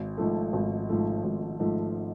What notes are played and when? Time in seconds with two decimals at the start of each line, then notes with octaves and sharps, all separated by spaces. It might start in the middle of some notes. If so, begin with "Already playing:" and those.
Already playing: G#1
0.18 G#2 F3 A3
0.53 G#1
0.89 G#2 F3 A3
1.24 G#1
1.60 G#2 F3 A3